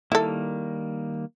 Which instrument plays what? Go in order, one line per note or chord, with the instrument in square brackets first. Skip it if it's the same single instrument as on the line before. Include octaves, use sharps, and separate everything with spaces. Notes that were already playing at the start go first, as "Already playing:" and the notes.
[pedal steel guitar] D#3 G3 A#3 [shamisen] E4 A4